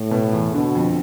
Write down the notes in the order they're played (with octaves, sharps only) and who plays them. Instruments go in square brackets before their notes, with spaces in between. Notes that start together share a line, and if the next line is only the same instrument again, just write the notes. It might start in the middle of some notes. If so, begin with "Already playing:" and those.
Already playing: [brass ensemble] A2
[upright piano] B2
E2
[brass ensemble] B2 [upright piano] D3
[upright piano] F2